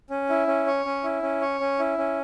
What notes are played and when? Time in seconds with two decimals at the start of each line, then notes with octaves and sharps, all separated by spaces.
0.10 C#4
0.29 E4
0.47 C#4
0.66 C#5
0.85 C#4
1.04 E4
1.22 C#4
1.41 C#5
1.60 C#4
1.79 E4
1.98 C#4